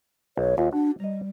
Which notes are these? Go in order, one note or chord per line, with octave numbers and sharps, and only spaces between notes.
B1 C#5
D#2 F4
D4 F#4 A5
G3 D#5 A#5